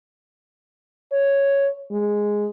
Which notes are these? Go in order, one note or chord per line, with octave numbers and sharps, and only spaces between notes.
C#5
G#3